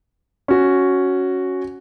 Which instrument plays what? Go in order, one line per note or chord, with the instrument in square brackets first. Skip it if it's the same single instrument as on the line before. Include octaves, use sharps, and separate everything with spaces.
[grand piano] C#4 F#4